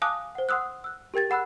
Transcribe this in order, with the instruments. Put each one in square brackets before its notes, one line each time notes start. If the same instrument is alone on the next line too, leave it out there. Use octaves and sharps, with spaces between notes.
[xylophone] F5 G#5 A5 D6 D#6 F#6
C5 F#5
F#5 C6 D#6 E6 F#6
E6 F#6
G4 A#4 G5 G#6 A6
G#4 F#5 B5 E6 F#6